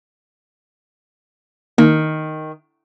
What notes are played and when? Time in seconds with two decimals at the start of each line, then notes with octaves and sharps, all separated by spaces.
1.78 D#3 A#3